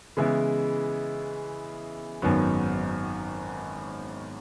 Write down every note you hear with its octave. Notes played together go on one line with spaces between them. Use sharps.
C#3 E3 G#3 B3 E4
G#1 F#2 D#3 F#3 B3